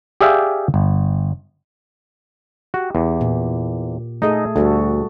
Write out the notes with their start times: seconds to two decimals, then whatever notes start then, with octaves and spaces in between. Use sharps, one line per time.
0.21 G4 G#4 D5 E5 F5 G5
0.74 G1
2.74 F#4 G4
2.95 E2
3.21 A#2
4.22 A3 D#4 G#4 A4 D#5
4.56 D2 G3 F#4 A4